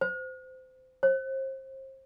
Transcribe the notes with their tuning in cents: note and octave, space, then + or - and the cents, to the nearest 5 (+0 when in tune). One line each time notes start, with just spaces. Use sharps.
C5 -20
C5 +30